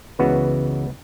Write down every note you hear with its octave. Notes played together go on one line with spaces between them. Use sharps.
C#2 C#3 E3 B3 F#4